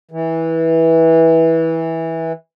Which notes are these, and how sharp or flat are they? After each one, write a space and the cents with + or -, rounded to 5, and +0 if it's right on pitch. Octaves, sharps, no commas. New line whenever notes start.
E3 -15